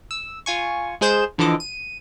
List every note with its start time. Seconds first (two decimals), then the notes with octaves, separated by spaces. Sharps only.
0.11 E6
0.46 F4 G#5 C#6
1.01 G#3 G#4 C5 G6 E7
1.38 D3 E3 F3 A4 D#5 D6
1.60 D#7